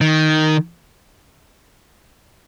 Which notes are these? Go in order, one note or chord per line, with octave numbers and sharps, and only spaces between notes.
D#3